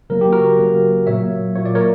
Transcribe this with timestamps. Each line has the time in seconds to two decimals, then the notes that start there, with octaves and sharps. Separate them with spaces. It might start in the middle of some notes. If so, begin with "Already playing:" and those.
0.10 C#3 F#3 A#3 A#4
0.21 G4
0.32 F#4 A#4
0.59 C#3 F#3 A#3
1.07 A#2 F#3 A#3 C#5 E5
1.56 A#2 F#3 A#3 C#5
1.66 D5
1.75 A#4 C#5